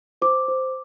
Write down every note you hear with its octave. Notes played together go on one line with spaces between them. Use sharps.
C5 D6
C5